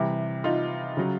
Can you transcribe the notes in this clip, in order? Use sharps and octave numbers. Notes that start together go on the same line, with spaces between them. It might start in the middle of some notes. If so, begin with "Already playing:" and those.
Already playing: C3 E3 G3
D#4 F4
C#3 F#3